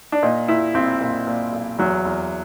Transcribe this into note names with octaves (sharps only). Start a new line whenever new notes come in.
D4
A#2 D#4
A#2 E4
B1 C4
A#2
A#2
B1
E2 F#3
E2